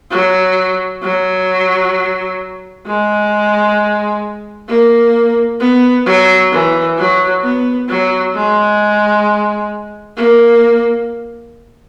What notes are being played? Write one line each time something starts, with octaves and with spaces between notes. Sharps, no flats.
F#3
F#3
G#3
A#3
B3
F#3
E3
F#3
B3
F#3
G#3
A#3